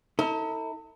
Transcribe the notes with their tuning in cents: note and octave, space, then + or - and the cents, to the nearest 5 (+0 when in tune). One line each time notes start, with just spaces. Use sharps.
E4 -45 A4 +40